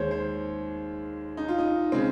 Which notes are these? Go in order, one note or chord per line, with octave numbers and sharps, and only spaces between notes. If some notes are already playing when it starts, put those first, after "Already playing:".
Already playing: D#2 D#3 G#3 C5 C#5
C5
D#4
F4
D#4
C#3 G#3 C4